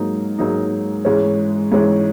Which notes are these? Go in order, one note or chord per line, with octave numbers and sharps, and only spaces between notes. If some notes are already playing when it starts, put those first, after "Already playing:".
Already playing: G#2 F#3 A#3 D#4
G#2 F#3 A#3 D#4
G#2 E3 G#3 C#4
G#2 E3 G#3 C#4